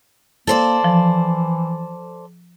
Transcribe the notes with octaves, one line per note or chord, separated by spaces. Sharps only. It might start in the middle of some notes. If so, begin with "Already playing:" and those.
A#3 A4 C5 D5
E3 F3